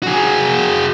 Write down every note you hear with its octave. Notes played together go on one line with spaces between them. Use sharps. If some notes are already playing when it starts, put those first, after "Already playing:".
F#4 G#4